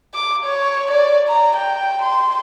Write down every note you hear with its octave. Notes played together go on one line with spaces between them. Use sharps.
D6
C#5
D5
A#5
G5
C6